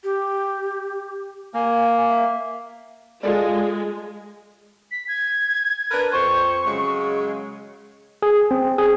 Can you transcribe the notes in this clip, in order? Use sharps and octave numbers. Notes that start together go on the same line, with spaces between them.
G4
A#3 G#5
E5
G#3 F4 A4 D5
B6
G#6
D4 A#4 B4
F2 C5 C#6
C#3 F#3 G#3
G#4
C4
G#4